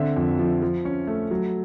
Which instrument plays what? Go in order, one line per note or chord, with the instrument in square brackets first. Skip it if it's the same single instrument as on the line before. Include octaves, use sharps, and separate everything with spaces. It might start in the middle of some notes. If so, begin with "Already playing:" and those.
Already playing: [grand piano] D3 C4 E5
F2
F3
F3
C#4
A3
F#3